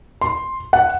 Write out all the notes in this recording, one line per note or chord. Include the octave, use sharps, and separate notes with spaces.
C6
F#5